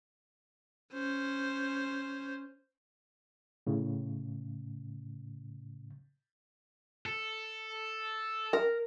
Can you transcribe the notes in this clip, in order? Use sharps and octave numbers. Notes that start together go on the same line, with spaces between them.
C#4 C5
A2 C#3
A4
A#4